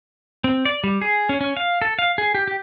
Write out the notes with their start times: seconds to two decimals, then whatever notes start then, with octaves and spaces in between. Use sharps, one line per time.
0.44 C4
0.65 D5
0.84 G3
1.01 G#4
1.29 C#4
1.41 C#4
1.57 F5
1.82 A4
1.99 F5
2.18 G#4
2.35 G4
2.48 G4